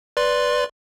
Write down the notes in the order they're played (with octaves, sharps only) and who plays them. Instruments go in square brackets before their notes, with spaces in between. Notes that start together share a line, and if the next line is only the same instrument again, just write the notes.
[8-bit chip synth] B4 D5 C6